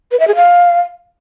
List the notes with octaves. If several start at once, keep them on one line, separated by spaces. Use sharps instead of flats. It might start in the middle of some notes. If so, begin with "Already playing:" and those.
B4
E5
G#4
F5